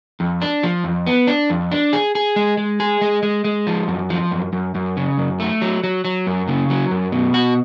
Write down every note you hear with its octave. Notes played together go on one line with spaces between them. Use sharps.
F2
D4
F3
F2
B3
D4
F2
D4
G#4
G#4
G#3
G#3
G#4
G#3
G#3
G#3
F3
F#2
F3
F#2
F#2
F#2
C#3
F#2
A3
F#3
F#3
F#3
F#2
C#3
F#3
F#2
B2
F#4